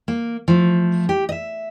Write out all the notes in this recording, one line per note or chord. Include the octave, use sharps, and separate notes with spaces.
A#3
F3 A3
G4
D#5 E5